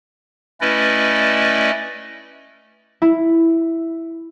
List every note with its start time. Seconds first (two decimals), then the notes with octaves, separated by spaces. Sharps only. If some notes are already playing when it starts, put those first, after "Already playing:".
0.61 A3 C#4 E4 B4 D5 D#5
3.02 E4